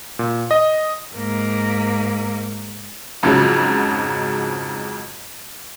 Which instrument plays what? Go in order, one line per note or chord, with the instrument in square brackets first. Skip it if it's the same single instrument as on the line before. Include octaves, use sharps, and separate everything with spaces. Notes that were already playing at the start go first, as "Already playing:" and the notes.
[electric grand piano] A#2
D#5
[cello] G#2 A#3
[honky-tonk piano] F2 G#2 C#3 F3 F#3 G#3